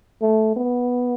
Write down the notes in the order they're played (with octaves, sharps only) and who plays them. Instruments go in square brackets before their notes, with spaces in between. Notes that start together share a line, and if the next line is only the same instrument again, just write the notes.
[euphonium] A3
B3